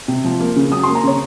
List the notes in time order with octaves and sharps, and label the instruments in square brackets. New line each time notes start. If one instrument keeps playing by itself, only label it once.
[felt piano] C3
F3
A#3
C#3
F#3 D#6
A#3 C6
A#5
C#3 C#5